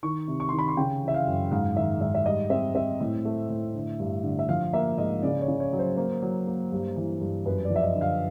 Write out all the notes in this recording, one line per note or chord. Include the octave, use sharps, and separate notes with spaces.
D#3 C#6
C3
C#6
D#3 C6
B5
C6
C#3 G5
E3
E5
F5
F#2
G#2 F5
D#3 E5
G#2 E5
E5
G3 D#5
C4 E5
C4 E5
A2
A3
A2
D3
G2
D3
E5
F3 F5
F5
A#3 E5
G#2 D#5
C#3 D5
C#5
C#3
C#5
F#3
C5
A#3 C5
F#3
A#3
G2
E3
G2
F#2 B4
D5
F3
E5
D#5
D3
F5